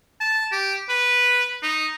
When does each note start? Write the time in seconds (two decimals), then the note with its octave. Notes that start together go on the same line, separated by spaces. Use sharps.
0.20 A5
0.52 G4
0.89 B4
1.63 D#4